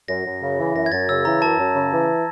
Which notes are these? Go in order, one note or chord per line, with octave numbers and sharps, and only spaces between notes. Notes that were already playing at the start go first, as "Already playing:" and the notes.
F#2 A#6
F#2
C#3
E3
F#2 A#6
G#6
F#2 A6
C#3 E6
E3 A#5
F#2 A5
F#2
C#3
E3